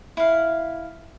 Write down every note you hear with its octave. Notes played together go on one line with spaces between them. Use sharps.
E4 F5